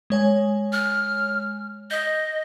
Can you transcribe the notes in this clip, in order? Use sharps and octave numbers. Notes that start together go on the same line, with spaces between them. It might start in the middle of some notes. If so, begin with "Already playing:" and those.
G#3 C#5 G#5
F6
D#5 D#6 G6